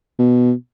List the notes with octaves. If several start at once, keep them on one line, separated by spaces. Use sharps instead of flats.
B2